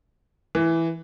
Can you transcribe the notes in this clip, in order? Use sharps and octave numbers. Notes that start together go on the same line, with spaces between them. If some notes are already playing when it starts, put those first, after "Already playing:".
E3